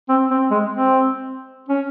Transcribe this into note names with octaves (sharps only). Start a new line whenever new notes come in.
C4
C4
G#3
C4
C#4